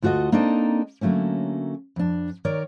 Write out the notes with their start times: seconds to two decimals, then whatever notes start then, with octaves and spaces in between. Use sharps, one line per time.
0.02 D2 F4 F#4 A4 D#5
0.32 A#3 C4 D4 D#4 A4 D#5
1.01 D3 F#3 A3 A#3 C#4
1.96 F2 D4
2.45 D#3 A#4 C#5 D5